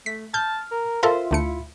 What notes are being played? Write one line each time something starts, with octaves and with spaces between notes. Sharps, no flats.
A3 B6
A5 F6 G6
A#4
F4 A4 A#4 C5 E5 F5
D2 A3 E4 C#7